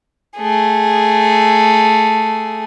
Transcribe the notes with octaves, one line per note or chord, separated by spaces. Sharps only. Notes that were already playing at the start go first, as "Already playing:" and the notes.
A3 G#4